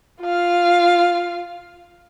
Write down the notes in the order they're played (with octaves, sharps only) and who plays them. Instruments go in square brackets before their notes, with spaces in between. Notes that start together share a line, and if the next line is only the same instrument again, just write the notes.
[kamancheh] F4 F5